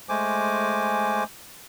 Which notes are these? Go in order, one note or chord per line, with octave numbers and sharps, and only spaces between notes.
G#3 A3 C5 G#5 D6